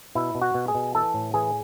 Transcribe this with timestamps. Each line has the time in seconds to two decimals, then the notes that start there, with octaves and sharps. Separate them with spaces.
0.15 B2 E4
0.35 B2
0.42 F#4
0.54 B2
0.68 G#4
0.75 B2
0.95 E3 A4
1.14 A2
1.34 E3 G#4